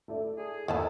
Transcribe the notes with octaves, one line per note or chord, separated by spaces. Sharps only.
A3 E4 D5
G#4
E2 D#3 A3 E4 A5